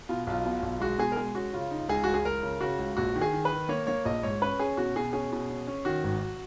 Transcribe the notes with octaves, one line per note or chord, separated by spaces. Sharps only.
B2 F4
B1 F4
B2
B1
G#3 F#4
B2 G#4
A#4
G#3 G#4
C#4 F#4
C#3 F4
D#4
C#2 G#4
C#2 F#4
G#4
C#2 A#4
C#3
C#3 F#4
C#2
A#1 F#4
D#3
G#4
D#3
B4
D#3
A#3 C#5
A#3 C#5
A#1 D#5
G#2 C#5
C#4 B4
C#4 G#4
B2 F#4
B2 G#4
C#4 G#4
B2
C#4
C#4
D#3 F#4
G#1